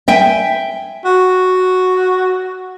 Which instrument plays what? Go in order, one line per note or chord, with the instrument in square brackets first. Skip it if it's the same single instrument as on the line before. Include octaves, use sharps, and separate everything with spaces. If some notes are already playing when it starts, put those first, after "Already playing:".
[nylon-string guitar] E5 G5 G#5
[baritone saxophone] F#4